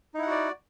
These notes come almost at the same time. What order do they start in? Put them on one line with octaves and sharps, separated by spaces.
D#4 E4 F#5 F#4 D5